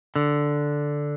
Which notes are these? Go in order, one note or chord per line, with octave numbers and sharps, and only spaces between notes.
D3